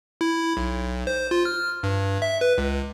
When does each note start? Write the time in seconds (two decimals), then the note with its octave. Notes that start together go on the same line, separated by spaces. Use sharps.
0.21 E4
0.57 B1
1.07 C5
1.31 F4
1.45 F6
1.83 G2
2.22 E5
2.41 B4
2.58 C#2